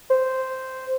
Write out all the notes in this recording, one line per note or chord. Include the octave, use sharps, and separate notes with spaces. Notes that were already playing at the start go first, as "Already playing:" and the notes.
C5